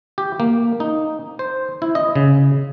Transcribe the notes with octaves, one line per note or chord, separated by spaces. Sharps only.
G4
A#3
D#4
C5
E4
D#5
C#3